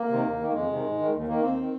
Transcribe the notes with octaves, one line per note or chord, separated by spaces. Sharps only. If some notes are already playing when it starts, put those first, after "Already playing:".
Already playing: A#3
C3 D#3
D#2
D#3
A#3
F2 G#3
C3 D#3
G#2
D#3
D#2
D#3 A#3
D#2 C4
D#3